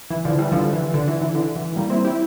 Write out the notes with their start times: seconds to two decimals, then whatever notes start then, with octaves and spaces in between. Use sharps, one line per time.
0.10 E3
0.25 D3 F3
0.38 E3 G3
0.52 D3 F3
0.73 E3
0.94 D3
1.07 E3
1.21 E3
1.35 D3
1.56 E3
1.76 G3 A#3
1.90 C4 E4
2.05 E4 G4